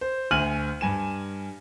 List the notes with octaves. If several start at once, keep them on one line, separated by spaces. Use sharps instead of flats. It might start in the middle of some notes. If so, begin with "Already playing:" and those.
C5
D2 G#5 F6 D#7 F#7
G2 G#5 E7